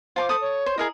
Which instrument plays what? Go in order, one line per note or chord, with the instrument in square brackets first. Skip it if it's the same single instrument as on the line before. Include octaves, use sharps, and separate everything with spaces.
[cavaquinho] F4 A5 D6 [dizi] C5
[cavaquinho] A4 D#6
[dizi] C#5
[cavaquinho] C5
[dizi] E4 [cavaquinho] G#4 A#4 D#5